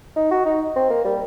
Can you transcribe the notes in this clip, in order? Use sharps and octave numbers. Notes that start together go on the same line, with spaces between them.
D#4
F#4
D#4
C4
A#3
G3